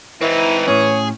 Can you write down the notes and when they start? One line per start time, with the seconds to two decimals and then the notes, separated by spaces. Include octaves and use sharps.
0.21 E3 C4 D#4 E4
0.68 A2 C#4 G#4 C#5